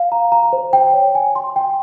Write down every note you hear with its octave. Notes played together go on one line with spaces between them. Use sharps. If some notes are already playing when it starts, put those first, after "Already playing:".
Already playing: F5
A#5
A#5
C5
G5
C#5
G#5
C6
G5